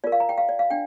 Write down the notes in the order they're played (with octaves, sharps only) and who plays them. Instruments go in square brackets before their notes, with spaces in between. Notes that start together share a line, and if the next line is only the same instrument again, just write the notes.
[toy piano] F4 A#4 D5
F5
A#5
G5
F5
D5
F5
D4 G5